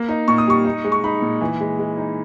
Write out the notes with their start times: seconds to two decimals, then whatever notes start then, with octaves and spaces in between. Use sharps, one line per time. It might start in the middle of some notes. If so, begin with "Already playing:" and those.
Already playing: A#3
0.09 D#4
0.28 A#2 C#6
0.38 D#6
0.47 G3 C#6
0.65 D#4
0.84 G#3
0.92 C#6
1.04 D#4 B5
1.22 A#2
1.41 E3
1.61 G#3
1.79 G#3
1.97 D#4